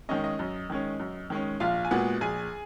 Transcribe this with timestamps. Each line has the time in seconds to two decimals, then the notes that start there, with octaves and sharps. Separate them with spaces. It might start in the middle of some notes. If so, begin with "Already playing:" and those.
0.09 D#3 G#3 C#4 D#5
0.24 D#5
0.39 F#2
0.70 D#3 G#3 C#4
1.00 F#2
1.30 D#3 G#3 C#4
1.60 A#1 F4 F5
1.85 G#5
1.91 A#2 G#3 B3 F#4 F#5
2.21 A#1 G#4 G#5